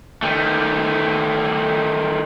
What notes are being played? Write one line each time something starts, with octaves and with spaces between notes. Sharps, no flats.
D#3 A3